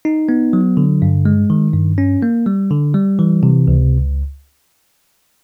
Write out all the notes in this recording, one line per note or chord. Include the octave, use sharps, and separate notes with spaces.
D#4
B3
F#3
D3
G2
G#3
D#3
G2
C#4
A#3
G3
D3
G3
E3
C3
C#2